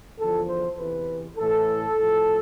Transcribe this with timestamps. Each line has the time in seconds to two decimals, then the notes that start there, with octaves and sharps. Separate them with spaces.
0.18 E2 D3 F3 A4
0.48 C5
0.78 E2 C3 E3 B4
1.37 A2 E3 A4
1.97 A2 F3